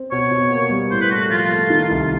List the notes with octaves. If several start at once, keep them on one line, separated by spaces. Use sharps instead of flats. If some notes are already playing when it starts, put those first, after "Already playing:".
Already playing: C4
B2 C#5
B2
A#3
G3
A2 C5
B4
A3 F#4
F#4
F3 F4
A3
D#3
C2
F4